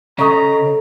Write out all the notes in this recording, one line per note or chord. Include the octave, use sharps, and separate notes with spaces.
C#3 A4 C#5 D#5 A#5